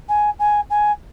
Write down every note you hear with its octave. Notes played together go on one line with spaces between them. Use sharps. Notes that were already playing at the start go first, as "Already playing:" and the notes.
G#5
G#5
G#5